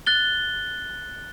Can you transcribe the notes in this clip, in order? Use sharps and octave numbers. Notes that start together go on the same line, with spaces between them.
F#6 A6 G7